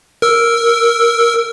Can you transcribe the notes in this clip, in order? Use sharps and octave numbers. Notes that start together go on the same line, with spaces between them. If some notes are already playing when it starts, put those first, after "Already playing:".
A#4 E6